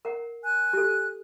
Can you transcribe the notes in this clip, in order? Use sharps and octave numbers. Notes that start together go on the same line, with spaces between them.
A#4 F#5
G#5 F#6
G4 A4